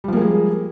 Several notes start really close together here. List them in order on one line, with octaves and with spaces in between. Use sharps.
G3 F3 A#3 G#3 G#4